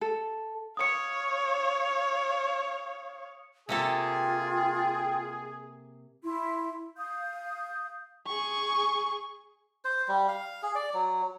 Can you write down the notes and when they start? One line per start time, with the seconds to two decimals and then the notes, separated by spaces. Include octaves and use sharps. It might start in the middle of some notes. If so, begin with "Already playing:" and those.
0.01 A4
0.77 C#5 F5 D#6 C#7
3.69 C3 A#3 F4 G#4 A4 G5
6.24 E4 C6
6.97 F5 D#6 G6
8.27 G#4 C#6
9.85 C5
10.08 G3
10.28 F5
10.63 G#4
10.75 D5
10.94 F#3